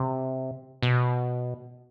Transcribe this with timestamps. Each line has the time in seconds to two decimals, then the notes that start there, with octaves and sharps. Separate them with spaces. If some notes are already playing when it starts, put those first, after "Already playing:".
Already playing: C3
0.83 B2